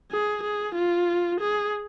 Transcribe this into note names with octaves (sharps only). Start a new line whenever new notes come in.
G#4
G#4
F4
G#4